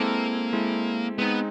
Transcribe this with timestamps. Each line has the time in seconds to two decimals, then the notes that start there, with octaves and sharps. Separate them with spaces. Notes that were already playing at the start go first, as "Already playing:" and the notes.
Already playing: G#3 A#3 C4 E4 A4
0.53 G#3 C4 E4 A4
1.18 G#3 B3 C4 D#4